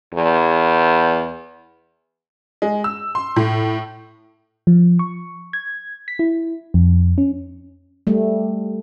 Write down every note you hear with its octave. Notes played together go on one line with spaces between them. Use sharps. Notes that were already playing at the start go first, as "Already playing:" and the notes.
E2
G#3
E6
C6
A2
F3
C#6
G#6
B6
E4
F2
C#4
G3 A3